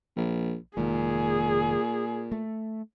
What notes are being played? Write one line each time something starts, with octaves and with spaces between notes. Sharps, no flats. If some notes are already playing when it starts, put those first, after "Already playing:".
A#1
F1 A#2 D#3 G#3 G#4
A3